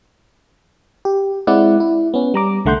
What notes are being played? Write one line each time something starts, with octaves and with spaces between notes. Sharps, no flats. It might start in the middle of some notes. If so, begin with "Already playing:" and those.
G4
G#3 C4 E4 D5 F#5
E4
B3 C#4
G3 A#5 D6
C2 D3 A3 F#5 C6 G6